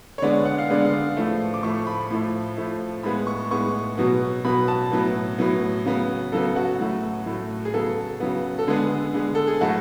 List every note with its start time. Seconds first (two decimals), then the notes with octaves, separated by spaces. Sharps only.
0.18 C#5
0.22 D3 G#3 B3 D5
0.45 F#5
0.58 F5
0.70 D3 G#3 B3 D5
0.85 F5
1.17 A2 F3 A3
1.54 D6
1.63 A2 F3 A3 C#6
1.87 B5
2.10 A2 F3 A3
2.58 A2 F3 A3
3.03 A2 G#3 B3 B5
3.27 C#6
3.51 A2 G#3 B3 C#6
3.97 B2 F#3 B3
4.44 B2 F#3 B3 B5
4.68 A5
4.91 A2 F#3 B3
5.38 A2 F#3 B3
5.86 C#3 F#3 B3
6.32 C#3 F#3 B3 A4
6.56 F#4
6.79 A2 F#3 A3
7.26 A2 F#3 A3
7.65 G#4
7.74 C#3 F#3 B3 A4
8.20 C#3 F#3 B3
8.59 A4
8.67 D3 G#3 B3 G#4
9.14 D3 G#3 B3
9.35 A4
9.47 G#4
9.61 A2 F#3 A3 F#4